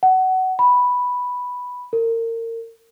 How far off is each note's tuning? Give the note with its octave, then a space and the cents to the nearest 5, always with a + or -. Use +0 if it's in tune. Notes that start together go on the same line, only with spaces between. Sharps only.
F#5 +20
B5 +0
A#4 -30